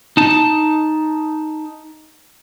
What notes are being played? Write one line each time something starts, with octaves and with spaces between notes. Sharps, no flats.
D#4 A5